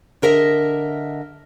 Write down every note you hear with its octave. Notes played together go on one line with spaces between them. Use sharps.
D3 A#4 D#5 E5